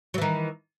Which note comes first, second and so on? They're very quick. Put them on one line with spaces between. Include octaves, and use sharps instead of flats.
F#3 E3 D#3